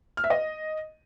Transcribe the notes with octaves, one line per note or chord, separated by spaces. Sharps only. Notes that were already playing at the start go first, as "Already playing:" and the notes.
F6
E5
D#5